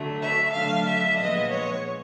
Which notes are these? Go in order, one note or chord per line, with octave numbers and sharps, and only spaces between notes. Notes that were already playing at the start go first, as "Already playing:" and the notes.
Already playing: D3 F#3 A3
E5
D3 F#3 A3 D4 F5
E5
A#2 F3 G#3 B3 D#5
C#5